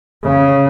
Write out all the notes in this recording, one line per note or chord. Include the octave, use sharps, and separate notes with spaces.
C#3